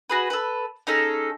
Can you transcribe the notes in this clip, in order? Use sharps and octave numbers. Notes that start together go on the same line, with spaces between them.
F#4 G#4 B4
A4 B4
C#4 D#4 G#4 A4